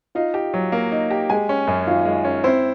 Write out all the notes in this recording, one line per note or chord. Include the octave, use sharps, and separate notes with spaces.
D#4 F4 F5
G4
F#3
A#3
D#4
G4
G#3 G#4 G#5
C#4
F#2
D#3 F4 F5
G#3
C#4
C4 E4 C5